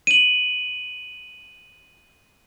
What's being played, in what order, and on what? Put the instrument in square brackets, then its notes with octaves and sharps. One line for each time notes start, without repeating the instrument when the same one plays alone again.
[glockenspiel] D#7 F#7